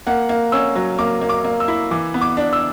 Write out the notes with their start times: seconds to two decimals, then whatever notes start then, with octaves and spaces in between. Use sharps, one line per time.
0.07 A#3 F#5
0.29 A#3
0.52 C#4 E6
0.75 F#3
0.98 A#3 D6
1.21 A#3
1.29 D6
1.44 A#3
1.60 E6
1.68 E4
1.91 E3 D6
2.14 B3
2.21 D6
2.37 D4
2.53 E6